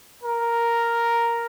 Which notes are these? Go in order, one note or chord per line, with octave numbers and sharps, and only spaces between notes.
A#4